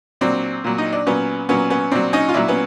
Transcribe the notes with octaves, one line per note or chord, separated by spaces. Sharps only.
A#2 F#3 C4 D4
A#2 F#3
D#4
D4
A#2 F#3 B3 C#4
A#2 F#3 B3 C#4
B3 C#4
A#2 F#3 C4 D4
C#4 D#4
F4
A#2 F#3 D4 E4
B3 C#4